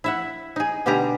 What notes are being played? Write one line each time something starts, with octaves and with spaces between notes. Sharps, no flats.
E4 E5 F#5
D#4 G#4
B2 D3 G3 G4 G#4 A#5